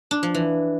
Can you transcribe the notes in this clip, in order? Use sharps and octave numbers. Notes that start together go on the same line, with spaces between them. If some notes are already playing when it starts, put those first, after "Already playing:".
D4
F3
E3